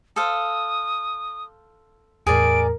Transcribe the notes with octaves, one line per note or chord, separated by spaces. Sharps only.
A4 C5 F5 D#6
E2 A2 G#4 A#4 D5 D7